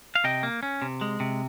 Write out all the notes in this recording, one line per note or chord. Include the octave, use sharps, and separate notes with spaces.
F5
C3 D#5 G5
A#3
C#4
C3
G#3
C3